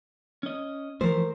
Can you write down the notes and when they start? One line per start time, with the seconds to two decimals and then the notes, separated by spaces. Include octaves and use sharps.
0.43 C#4 D#5
1.01 E3 F3 A3 A#4 C5